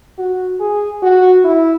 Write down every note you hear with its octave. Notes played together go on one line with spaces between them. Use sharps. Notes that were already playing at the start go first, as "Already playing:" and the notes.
F#4
G#4
F#4
E4